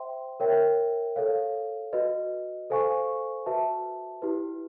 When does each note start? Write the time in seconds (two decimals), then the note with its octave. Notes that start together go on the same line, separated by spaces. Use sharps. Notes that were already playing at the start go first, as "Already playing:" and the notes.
Already playing: C5 E5 G5 C6
0.40 A#4 C#5 E5 G5
1.16 A4 C#5 F5
1.93 F#4 B4 D#5
2.70 A4 C5 F5 G#5 C#6
3.46 F#4 B4 E5 A5
4.22 E4 G4 B4